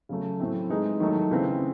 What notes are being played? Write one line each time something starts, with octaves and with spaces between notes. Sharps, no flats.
C#3 F#3 A3
A2 F#3 A3 C4 E4
E3 G#3 D#4
D#3 F#3 A3
C#3 E3 C4